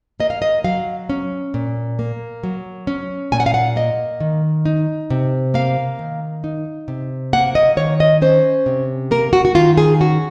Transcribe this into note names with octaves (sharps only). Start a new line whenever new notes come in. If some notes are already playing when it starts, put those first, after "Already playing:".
A#3 D#5
F5
D#5
F#3 F5
C#4
A#2
A#3
F#3
C#4
A#2 G#5
F#5
F5
F#5
A#3 D#5
D#3
D#4
C3
A#3 F5
D#3
D#4
C3
A#3 F#5
D#5
D#3 C#5
D#5
C#4 C5
C3
A#3 A#4
F#4
F#4
D#3 F4
G#4
C#4 F#4